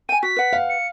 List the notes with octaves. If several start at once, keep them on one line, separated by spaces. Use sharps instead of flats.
G5 G#5 D#7
F#4 B6
B4 F#5
F5
C#7